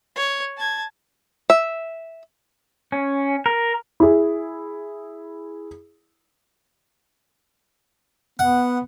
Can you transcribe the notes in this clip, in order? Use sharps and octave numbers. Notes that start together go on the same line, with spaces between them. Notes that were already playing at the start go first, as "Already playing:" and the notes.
C#5
A5 G#6
E5
C#4
A#4
E4 G#4
B3 F#5